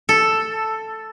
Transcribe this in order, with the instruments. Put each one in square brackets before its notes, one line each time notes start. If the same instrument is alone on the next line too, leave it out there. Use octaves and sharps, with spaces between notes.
[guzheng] A4